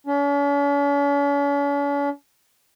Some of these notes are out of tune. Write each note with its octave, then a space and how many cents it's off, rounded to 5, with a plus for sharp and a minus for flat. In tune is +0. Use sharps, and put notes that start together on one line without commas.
C#4 +45